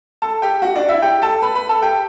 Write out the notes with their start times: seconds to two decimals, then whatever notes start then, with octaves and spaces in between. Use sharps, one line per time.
0.22 A4 A5
0.42 G4 G5
0.62 F#4 F#5
0.76 D4 D5
0.88 E4 E5
1.02 G4 G5
1.22 A4 A5
1.42 B4 B5
1.55 B4 B5
1.69 A4 A5
1.82 G4 G5